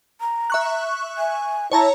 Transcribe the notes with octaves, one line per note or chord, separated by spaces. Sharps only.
A#5
E5 C#6 F#6
G#5
E4 C#5 A5 A#5